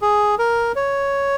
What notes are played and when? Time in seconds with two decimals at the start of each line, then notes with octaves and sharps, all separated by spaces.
0.02 G#4
0.39 A#4
0.76 C#5